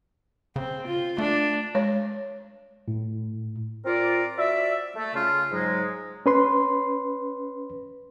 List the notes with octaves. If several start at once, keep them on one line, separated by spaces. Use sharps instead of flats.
C#3 C4
F4
A3 D4
G#3 C#5
A2
C4 F4 A#4 D5
F#4 D5 E5
A3
C#3 F4
G#2 F#3 G#3
C#4 B4 C6